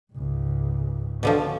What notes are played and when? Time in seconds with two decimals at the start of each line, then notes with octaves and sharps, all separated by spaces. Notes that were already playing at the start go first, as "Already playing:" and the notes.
0.13 C#2 G#2
1.23 B2 D3 F3 C#4